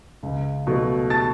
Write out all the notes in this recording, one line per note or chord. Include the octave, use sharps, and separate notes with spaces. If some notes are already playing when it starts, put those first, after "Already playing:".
C#2
B2 F#3 A3
A5 A6